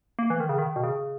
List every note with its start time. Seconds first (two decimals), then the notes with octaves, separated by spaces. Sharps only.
0.19 A#3
0.30 E3
0.40 D#3
0.49 C#3
0.58 D#3
0.76 B2
0.84 C#3